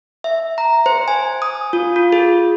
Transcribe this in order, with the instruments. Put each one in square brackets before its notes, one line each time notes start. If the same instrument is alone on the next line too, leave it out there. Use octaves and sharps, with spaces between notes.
[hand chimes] E5
A#5
C5
G#5
D#6
F4
F4
G#4